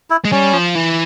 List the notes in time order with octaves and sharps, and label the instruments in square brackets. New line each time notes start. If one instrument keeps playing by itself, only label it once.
[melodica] E4
[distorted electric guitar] G#3
[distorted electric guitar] G3 [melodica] C#4
[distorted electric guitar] F3
E3